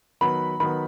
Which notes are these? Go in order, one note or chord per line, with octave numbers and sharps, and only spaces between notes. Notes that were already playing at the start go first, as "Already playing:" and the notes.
D#3 F#3 B3 B5
D#3 F#3 B3 B5